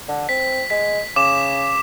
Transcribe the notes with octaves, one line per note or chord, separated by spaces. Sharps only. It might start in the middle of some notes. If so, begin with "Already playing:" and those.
D3
C4 B6
G#3 B6
C#3 D6 E7